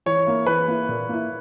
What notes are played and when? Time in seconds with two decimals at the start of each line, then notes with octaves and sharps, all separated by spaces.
0.06 E3 C#5
0.26 A#3 E4
0.47 E3 B4
0.68 A#3 E4
0.89 A#2
1.09 A#3 E4